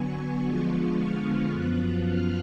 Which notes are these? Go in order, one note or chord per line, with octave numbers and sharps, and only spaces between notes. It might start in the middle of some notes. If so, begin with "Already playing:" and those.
Already playing: D3 F#3 B3 G#5 C#6
D3 F3 G#3 B3 F4
F6
F#2 F3 B3 F4 F#6
F6